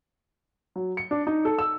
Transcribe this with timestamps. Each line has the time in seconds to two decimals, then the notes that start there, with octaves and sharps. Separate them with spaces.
0.76 F#3
0.97 C#7
1.11 D4
1.27 D#4
1.45 A4
1.59 E6